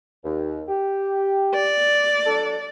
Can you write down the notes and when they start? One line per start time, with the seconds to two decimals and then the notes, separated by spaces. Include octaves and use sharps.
0.24 D#2
0.69 G4
1.54 D5
2.26 F#3 D4 A4